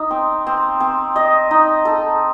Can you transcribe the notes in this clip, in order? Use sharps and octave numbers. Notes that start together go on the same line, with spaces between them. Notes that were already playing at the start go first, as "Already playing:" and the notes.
Already playing: D#4
C4
C4
C4
D#5
D#4
A4